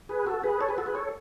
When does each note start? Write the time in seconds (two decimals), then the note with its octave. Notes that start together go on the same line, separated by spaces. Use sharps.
0.09 G#4 B4
0.26 F#4 A4
0.44 G#4 B4
0.61 A4 C#5
0.69 G#4 B4
0.78 F#4 A4
0.86 G#4 B4
0.95 A4 C#5